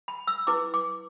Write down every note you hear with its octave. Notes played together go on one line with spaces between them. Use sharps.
B5
E6
E4 B4 D6
D6